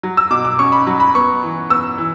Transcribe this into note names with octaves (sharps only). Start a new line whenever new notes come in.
F#3
E6
B2 D6
D6
C#4 C#6
B5
F#3
B5
B3 C#6
E3
B3 E6
E3